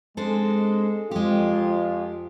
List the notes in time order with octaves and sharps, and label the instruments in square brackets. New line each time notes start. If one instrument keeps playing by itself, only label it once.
[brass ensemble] G#3 [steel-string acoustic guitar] C4 D4 A4
[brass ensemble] F2 F4 [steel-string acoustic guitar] G#3 G4